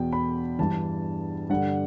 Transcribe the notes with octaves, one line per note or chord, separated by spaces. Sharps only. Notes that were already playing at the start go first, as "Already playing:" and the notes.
Already playing: E2 B2 G5
B5
G2 E3 A5
G2 D3 F#5